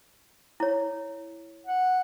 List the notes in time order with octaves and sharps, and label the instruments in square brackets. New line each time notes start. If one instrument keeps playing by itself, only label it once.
[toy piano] E4 C#5
[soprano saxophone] F#5